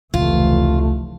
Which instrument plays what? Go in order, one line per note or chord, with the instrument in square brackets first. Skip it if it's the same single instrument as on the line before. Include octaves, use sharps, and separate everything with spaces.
[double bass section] F1 E3 [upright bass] C#2 [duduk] A3 [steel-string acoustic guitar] F4